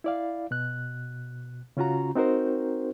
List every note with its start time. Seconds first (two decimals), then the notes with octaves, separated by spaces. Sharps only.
0.04 E4 D5 F5
0.51 B2 F#6
1.77 C#3 C#4 F4 F#4 A#5
2.15 C4 D#4 F#4 A#4 C5